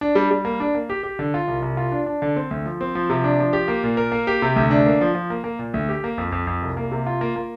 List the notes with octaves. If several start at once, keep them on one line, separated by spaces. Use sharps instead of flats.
D4
G3
G3
A#3
D4
A#3
G4
G4
D3
F4
C2
C2
F4
D4
D4
D3
C4
D2
F3
C4
F3
C3
D4
F3
G4
A#3
A#2
A#4
A#3
G4
C3
D2
D4
A#3
F3
F3
A#3
A#3
A#2
D2
G4
A#3
F2
F2
F2
C2
A#3
C3
F4
A#3
A#3